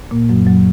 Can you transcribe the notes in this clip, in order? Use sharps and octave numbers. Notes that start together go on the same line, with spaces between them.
A#2 A#3
F#2 F#3
F#3